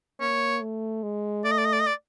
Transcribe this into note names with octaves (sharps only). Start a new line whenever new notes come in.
A#3 C#5
A3
G#3
A3 D5
D#5
D5
D#5
D5
D#5
D5